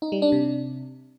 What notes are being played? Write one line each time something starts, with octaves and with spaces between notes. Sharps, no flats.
D#4
G3
D4
C3